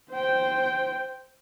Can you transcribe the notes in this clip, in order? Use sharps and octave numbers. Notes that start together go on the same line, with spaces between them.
C5 G5